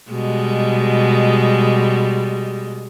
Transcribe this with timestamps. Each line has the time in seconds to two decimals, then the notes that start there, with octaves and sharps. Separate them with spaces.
0.10 B2 G3 G#3